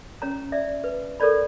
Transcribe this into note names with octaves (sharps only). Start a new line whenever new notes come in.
C#4 C#5 A#5
D5 E5
B4
A4 A#4 C#5 D5 B5